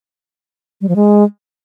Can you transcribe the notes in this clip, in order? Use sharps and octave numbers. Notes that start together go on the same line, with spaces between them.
G3
F3
G#3